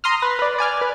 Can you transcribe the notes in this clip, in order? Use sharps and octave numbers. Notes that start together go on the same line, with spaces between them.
A#5 C6 D#6 F6
B4
B4 D5
D5 G#5 F6
B4